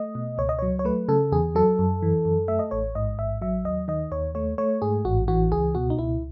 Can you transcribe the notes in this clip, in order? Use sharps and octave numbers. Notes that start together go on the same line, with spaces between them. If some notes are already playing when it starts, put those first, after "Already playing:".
Already playing: A3 D#5
B2
C#2 C#5
D#5
F#3 C#5
C#5
A3 B4
C#3 A4
E2 G#4
F#3 A4
F#2
E3
F#2
A3 E5
D#5
A1 C#5
G#2 D#5
A1 E5
F#3 E5
D#2 D#5
D#3 D#5
D#2 C#5
A3 C#5
A3 C#5
G#2 G#4
A1 F#4
E3 F#4
C#2 G#4
B2 F#4
D#4
C#2 E4